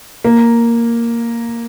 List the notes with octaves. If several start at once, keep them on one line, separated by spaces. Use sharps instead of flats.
A#3